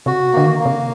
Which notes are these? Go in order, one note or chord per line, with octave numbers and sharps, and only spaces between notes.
C3 F#4
D3 A#3
D#3
A#3
C3